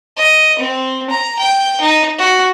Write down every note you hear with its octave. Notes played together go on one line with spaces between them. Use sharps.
D#5
C4
A#5
G5
D#4
F#4